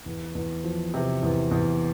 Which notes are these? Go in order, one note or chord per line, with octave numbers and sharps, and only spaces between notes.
E2
E2
F3
C3
E2
E2